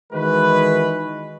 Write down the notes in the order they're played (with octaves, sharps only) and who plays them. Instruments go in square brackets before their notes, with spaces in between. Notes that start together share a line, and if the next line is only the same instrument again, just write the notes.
[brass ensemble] D#3 E3 G#3 F#4 B4